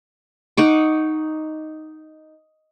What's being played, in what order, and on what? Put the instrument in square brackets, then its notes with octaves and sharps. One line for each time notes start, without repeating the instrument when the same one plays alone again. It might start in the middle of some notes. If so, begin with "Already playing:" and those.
[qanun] D#4 F#5 C#6 D6